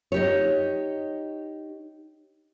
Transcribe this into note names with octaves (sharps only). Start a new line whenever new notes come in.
D#4 G4 C#5